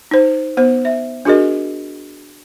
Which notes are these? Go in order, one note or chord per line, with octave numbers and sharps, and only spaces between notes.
D#4 C5
B3 C5
E5
D4 F#4 G#4 A#4 D#5